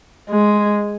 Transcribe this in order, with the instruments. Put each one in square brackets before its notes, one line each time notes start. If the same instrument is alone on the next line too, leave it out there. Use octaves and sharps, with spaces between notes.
[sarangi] G#3